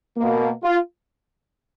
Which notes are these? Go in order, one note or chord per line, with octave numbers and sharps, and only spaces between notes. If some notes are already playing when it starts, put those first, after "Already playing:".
B2 A#3
F4